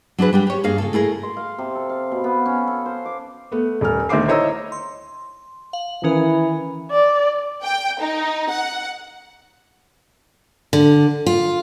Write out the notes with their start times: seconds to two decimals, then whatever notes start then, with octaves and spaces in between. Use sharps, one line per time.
0.18 F#3 D4 G#4 B4
0.33 G3 D4 G4
0.47 G4 C#5
0.64 G2 A#3 G#4 A#4 F5
0.78 C#3 F4 A4
0.93 A3 E4 G#4 A#4
1.23 C6
1.37 F5
1.58 C3
1.75 A4
1.90 F5
2.11 B2
2.24 B3
2.46 C#4
2.67 A4
2.86 C5
3.05 D6
3.52 A3 B3
3.81 D#1 A3 F6
4.09 D2 D#3 C5 E5 D6 C7
4.28 E4 C5 C#5 D#5 A#5 E6
4.72 C6
5.73 F5 F#7
6.04 D#3 E3 C#4 A#4
6.91 D5
7.63 G5
8.00 D#4
8.50 F#5
10.73 D3
11.26 F4